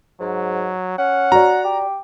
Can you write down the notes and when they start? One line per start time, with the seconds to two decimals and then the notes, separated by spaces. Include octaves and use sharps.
0.21 G#2 F#3
0.98 C#4 F#5
1.32 F#4 D5 A#5
1.64 G4